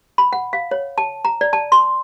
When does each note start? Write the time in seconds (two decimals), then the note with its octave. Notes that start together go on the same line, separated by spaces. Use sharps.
0.18 B5
0.33 F#5
0.53 F5
0.71 C#5
0.98 A5
1.25 A#5
1.41 D5
1.53 A5
1.72 C6